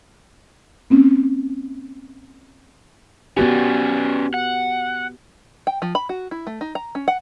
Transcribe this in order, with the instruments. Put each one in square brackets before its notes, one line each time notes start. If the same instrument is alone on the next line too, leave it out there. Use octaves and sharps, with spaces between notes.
[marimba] A#3 C4 C#4
[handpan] B3 F#4 G4 [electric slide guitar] C#4 B4 D5
[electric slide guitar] F#5
[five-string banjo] G5
F3
B5
F#4
E4
A3
D#4
A#5
C#4
F#5